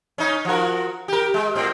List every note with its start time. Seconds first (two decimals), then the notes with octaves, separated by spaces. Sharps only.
0.18 C#4 D#4
0.45 F3 F#4 A#4
1.08 G4 A#4
1.34 G#3
1.56 A2 C4